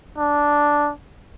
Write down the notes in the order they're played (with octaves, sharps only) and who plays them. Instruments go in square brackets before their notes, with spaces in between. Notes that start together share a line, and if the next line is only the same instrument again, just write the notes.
[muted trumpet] D4